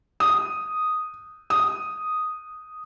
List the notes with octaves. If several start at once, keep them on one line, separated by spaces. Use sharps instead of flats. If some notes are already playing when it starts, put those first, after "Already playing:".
D#6
D#6